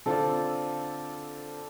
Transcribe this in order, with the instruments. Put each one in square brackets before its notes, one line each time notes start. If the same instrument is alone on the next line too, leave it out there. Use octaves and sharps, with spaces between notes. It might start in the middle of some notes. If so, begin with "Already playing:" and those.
[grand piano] D3 C4 F4 [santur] A4 D5